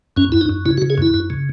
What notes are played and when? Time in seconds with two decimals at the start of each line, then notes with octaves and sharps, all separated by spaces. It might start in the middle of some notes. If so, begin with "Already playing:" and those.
0.17 F#2 C#4
0.32 F#2 E4
0.41 D#4
0.49 F#2
0.65 C#3 E4
0.78 F#4
0.82 C#3
0.90 G#4
0.98 F#2 E4
1.14 F#2
1.30 C#3